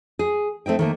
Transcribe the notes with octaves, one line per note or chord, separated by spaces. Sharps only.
G#4
A3 C4 D#4 G5
D#3 A3 A#3